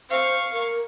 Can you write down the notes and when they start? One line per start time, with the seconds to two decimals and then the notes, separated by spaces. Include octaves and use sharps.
0.10 C5 F5 C#6
0.52 A#4